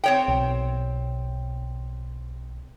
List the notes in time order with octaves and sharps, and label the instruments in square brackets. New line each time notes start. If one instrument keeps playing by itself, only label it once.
[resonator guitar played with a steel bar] C4 C#5 G5
[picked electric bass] B1